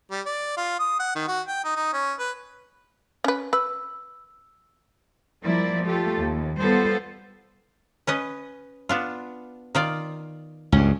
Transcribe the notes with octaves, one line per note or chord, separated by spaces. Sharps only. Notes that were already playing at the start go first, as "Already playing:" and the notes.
G3
D5
F4
D#6
F#5
D#3
F#4
G5
D#4
D#4
C#4
B4
C#4 B4
B4 E6
F3 G3 A#3 E4 D5
A3 F4 G4 A4
D#2
G3 B3 F4 A4 C5
C#4 B4 D#5
B3 D4 F4
D#3 F4 D5
C#2 G2 C#4